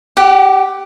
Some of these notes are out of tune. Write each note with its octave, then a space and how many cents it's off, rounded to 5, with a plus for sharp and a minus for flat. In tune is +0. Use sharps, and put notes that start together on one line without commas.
G4 +0 F#5 +35